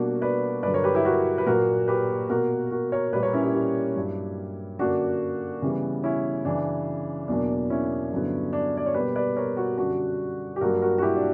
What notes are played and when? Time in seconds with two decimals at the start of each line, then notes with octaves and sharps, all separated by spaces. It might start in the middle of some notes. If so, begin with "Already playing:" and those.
Already playing: B2 G3 A#3 D4 F#4
0.21 B4 D5
0.63 G2 D3 F#3 B4 D5
0.74 A#4 C#5
0.84 G4 B4
0.94 E4 G4
1.05 F#4 A#4
1.38 B4
1.46 A#2 F#3 A#3 F#4 A#4
1.88 G4 B4
2.29 B2 A#3 F#4 A#4
2.71 F#4 A#4
2.92 A#4 C#5
3.13 A#2 G3 A#3 B4 D5
3.23 A#4 C#5
3.33 C#4 E4
3.44 E4 G4
3.54 E4 G4
3.96 G2 F#3 A#3
4.79 F#2 D3 A#3 D4 F#4
5.62 C#3 E3 G3 B3
6.04 C#4 E4
6.45 F#2 C#3 E3 D4
7.28 E2 B2 F#3 A#3 D4
7.70 C#4 E4
8.11 G2 D3 F#3 B3
8.53 D4
8.77 D5
8.86 C#5
8.94 B2 G3 A#3 G4 B4
9.16 B4 D5
9.36 A#4 C#5
9.57 F#4 A#4
9.78 F#2 D3 G3 D4 F#4
10.56 G4
10.61 G2 F#3 A#3 F#4 A#4
10.82 F#4 A#4
10.98 F#4
11.02 E4 G4
11.16 D4